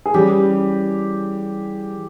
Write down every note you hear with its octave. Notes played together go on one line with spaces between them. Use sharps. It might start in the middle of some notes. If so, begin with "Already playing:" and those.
G#4
E3 G3 C#4 G4